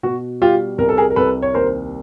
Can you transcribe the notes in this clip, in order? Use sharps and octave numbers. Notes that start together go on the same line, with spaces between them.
B2 F#4
G3 F4 G4
C2 A#4
A4
G#4 A#4
A#4
C2 A4 B4
C#5
D#2 A#4 C5